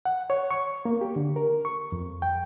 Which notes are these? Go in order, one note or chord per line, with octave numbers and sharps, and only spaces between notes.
F#5
C#5
C#6
A#3
G4
D3
A#4
C#6
F2
G5